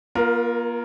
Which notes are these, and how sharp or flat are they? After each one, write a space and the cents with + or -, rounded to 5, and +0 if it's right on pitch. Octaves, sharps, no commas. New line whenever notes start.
A#3 +40 F4 +0 A#4 +0